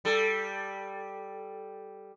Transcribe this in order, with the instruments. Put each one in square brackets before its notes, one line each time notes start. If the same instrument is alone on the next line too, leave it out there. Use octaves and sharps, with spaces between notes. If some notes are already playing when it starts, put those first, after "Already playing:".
[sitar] G3 A4